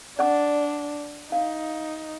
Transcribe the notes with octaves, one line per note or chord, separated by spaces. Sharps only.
D4 D5 F#5 D6
D#4 F5